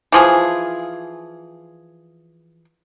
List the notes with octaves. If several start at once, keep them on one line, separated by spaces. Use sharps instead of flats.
E3 F3 G#4